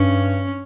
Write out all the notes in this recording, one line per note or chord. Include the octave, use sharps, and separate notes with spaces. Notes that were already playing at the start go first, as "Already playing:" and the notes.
Already playing: G2 C#4